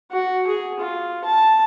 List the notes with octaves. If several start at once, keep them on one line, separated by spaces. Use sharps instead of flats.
F#4
G#4
F4
A5